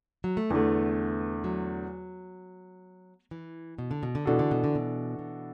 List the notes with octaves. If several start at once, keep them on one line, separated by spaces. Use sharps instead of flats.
F#3
A3
E2 D3 A3 B3
F#3
E3
B2
D3
B2
D3
B2 E3 D4 F#4 A4
D3
B2
D3
B2
B2